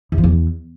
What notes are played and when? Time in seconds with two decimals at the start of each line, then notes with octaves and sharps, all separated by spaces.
0.12 E2
0.18 F3
0.24 E2